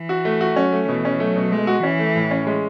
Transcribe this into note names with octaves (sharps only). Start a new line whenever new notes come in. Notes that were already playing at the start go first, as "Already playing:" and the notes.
Already playing: E3
F#4
A3
F#4
F#3 C#4
A3
B2 E3
C#4
F#3 A3
B2
G#3 A3
F#4
E3 C#4
A3
A2
C#4
G#3